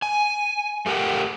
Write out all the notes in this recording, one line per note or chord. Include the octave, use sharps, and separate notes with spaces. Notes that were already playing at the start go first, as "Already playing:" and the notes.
G#5
A3 G4 A#4 F#5 G5